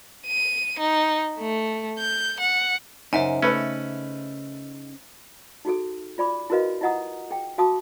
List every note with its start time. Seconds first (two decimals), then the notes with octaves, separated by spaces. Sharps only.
0.27 D#7
0.79 D#4
1.39 A3
1.98 G6
2.40 F#5
3.13 F#2 C#3 D#4 C5 E5 G#5
3.42 A3 C#4 A4 B4
5.65 D#4 F#4 G#4 A4
6.18 F4 D5 B5 D6
6.50 E4 F#4 A#4 B4 D#5 F5
6.81 E4 F4 D#5 F#5 A#5 D#6
7.31 G#4 G5
7.58 F#4 F5 A5 D6 D#6